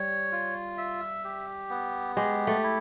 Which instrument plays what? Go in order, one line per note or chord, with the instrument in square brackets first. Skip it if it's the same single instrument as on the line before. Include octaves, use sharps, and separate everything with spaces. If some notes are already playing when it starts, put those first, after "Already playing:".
Already playing: [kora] G3 [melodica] C#5
[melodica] F4
E5
G4
B3
[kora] G#3 [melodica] G4
[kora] A3
[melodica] E4